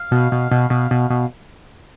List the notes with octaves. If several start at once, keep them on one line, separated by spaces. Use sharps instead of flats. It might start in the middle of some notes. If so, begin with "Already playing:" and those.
Already playing: F5
B2
B2
B2
B2
B2
B2